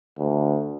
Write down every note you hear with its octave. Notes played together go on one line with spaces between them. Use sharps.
D2